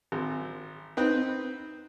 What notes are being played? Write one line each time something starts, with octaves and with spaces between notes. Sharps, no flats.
G#1
C4 D#4 B4